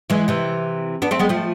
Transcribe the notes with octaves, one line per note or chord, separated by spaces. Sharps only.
E3 G#3
C3 E3
B3 D4
A3 C4
G#3 B3
F3 A3